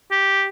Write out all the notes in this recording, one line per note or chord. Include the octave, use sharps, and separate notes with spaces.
G4